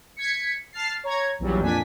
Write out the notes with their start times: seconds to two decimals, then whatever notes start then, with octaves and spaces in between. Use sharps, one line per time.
0.16 G#6 B6 C#7
0.73 A5 F6 A6 C7
1.04 C#5 A#5 G#6
1.39 A#1 E2 E3 F#3 G3
1.61 F2 A#2 D4 G#5 B6